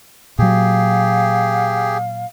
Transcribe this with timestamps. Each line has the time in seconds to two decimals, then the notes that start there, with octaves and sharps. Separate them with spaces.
0.39 A#2 F#3 G4 G#4 F5